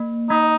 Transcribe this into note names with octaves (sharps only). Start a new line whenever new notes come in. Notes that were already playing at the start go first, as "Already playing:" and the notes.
Already playing: A#3
A#3 D#4